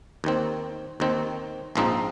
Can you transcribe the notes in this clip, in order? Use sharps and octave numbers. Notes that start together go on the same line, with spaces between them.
D#2 D#3 C4
D#2 D#3 C4
A#1 G#2 F3 C4 D#4